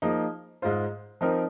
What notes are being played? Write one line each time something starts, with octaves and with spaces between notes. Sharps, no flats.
F3 A#3 D#4 G#4
G#2 G#3 F4 C5
F3 C4 D#4 A#4